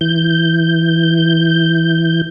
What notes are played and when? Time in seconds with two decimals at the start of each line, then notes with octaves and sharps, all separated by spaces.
0.01 E3 G6